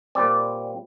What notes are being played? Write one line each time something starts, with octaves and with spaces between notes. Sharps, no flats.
A#2 G3 C4 D5